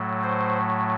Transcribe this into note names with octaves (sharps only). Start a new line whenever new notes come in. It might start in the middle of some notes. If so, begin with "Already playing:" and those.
Already playing: A2 F#3 A3
C5